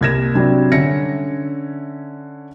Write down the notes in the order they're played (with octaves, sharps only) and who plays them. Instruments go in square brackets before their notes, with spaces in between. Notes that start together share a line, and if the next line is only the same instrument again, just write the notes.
[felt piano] C2 A#3 G#6 A#6 E7
C3 F#3 G3 C4 D4 F#4
D3 C#4 E5 A#6 C#7